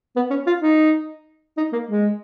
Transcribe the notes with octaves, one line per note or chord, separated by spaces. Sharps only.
B3
C#4
F4
D#4
D#4
A#3
G#3